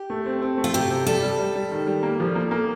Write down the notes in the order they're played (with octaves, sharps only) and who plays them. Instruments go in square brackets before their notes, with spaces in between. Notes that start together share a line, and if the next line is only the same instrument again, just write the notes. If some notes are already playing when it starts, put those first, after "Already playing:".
Already playing: [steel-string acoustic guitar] G4
[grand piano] A3
C4
C4
A3
[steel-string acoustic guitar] F4
[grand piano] C3 [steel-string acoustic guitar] G4
[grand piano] C3
[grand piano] G3 [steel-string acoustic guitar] A4
[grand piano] G3
G3
G3
D#3
G3
A#3
F3
A#3
A#3